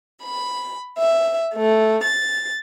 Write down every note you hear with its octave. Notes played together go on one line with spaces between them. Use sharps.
B5
E5
A3
A6